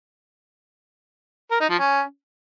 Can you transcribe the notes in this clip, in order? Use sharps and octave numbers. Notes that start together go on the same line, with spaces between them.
A#4
D#4
F3
C#4